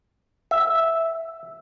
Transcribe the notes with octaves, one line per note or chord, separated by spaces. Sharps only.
E5